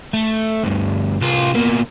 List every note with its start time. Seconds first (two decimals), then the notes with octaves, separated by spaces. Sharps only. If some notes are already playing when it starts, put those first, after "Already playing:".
0.13 A3
0.64 D2 G2
1.21 C2 F4
1.54 B2 A#3